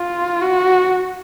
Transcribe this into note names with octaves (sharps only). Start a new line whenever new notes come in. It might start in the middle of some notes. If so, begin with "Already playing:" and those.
Already playing: F4
F#4